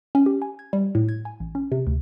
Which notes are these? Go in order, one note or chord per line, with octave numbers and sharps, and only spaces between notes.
C#4
G4
G#5
G#6
G3
A2
G#6
G#5
A1
C#4
C3
D2